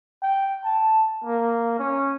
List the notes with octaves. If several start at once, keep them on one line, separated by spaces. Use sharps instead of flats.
G5
A5
A#3
C#4